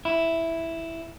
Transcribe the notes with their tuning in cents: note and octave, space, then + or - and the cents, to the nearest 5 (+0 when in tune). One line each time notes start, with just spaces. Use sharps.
E4 +0